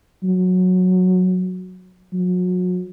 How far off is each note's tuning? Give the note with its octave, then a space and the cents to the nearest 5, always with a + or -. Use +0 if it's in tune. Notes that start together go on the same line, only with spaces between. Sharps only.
F#3 -10
F#3 -35